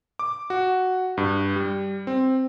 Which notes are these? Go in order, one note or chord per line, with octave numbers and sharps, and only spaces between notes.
D6
F#4
G2
G3
C4